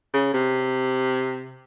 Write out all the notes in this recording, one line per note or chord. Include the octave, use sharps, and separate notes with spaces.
C#3
C3